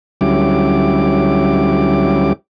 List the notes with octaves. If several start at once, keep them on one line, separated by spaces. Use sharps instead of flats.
D2 F#3 G3 C#4 E4 D6